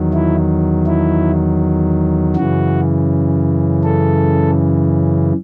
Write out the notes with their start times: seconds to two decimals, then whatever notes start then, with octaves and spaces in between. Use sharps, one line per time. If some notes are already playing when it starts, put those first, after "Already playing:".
Already playing: E2 D#3 F#3
0.13 E4
0.87 E4
2.36 F#2 C#3 E3 F#4
3.84 A4